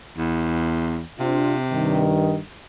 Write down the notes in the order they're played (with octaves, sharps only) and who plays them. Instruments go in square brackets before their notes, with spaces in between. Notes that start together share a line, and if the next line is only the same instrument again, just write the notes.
[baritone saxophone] E2
[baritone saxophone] C3 [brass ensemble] C4 D4 F4
[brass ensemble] G2 D#3